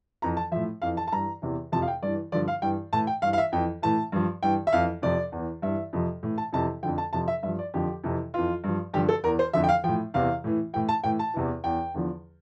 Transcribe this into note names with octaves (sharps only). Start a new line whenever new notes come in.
F2 E3 A#5
A5
A2 F3 E5
F2 E3 F5
A5
A5
G2 E3 A#5
E2 C3 E3
F2 C3 F3 A5
F5
G5
G2 E3 D5
G2 D3 F3 D5
F5
G2 E3 G5
A2 E3 A5
G5
G2 E3 F5
F5
E5
F2 E3 G5
A2 E3 A5
G2 F3
G2 E3 G5
E5
F2 E3 F5
F2 C3 F3 D5
E2
E3
G2 E3 E5
F2 C3 F3
A2 E3
A5
F2 C3 E3 A5
F2 D3 F3 G5
A5
F2 C3 F3 A5
E5
G2 F3 E5
D5
F2 D3 F3 G4
F2 C3 E3
F2 E3 F4
G2 F3
G2 D3 F3 G4
A4
E2 E3 A#4
C5
F2 D3 F3 E5
G5
F5
A2 F3 G5
E2 C3 E3 F5
A2 E3
A2 E3 G5
A5
A2 E3 G5
A5
E2 C3 E3
E2 E3 G5
E2 D3 F3